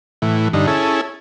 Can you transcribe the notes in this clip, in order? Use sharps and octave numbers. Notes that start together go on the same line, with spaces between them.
A2 E3
G2 D3 D#4
C#4 E4 G#4 A4